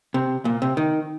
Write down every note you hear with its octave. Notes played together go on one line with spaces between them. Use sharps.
C3
A#2
C3
D#3